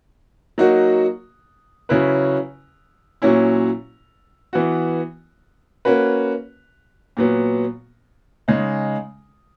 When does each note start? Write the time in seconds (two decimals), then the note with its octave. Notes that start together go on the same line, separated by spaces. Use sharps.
0.58 F#3 A#3 D#4 F#4
1.89 C#3 F#3 C#4 E4 B4
3.22 A#2 F#3 C#4 E4
4.53 E3 B3 F#4
5.85 A#3 C#4 F#4 B4
7.17 A#2 F#3 B3
8.48 C#3 G#3 D#4